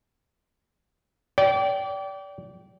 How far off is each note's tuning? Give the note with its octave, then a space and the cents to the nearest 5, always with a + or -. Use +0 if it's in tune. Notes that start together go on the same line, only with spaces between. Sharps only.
D5 -30 G5 -20